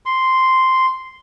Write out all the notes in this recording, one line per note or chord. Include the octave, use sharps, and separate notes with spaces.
C6